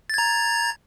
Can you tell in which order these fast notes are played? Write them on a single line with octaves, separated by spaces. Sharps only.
A6 G#6 A#5